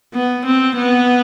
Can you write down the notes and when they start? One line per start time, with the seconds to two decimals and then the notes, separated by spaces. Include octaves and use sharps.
0.14 B3
0.45 C4
0.76 B3